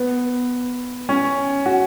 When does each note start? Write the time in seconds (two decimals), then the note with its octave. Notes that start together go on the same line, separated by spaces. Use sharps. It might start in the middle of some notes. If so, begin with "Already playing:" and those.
Already playing: B3
1.09 C#4
1.66 F#4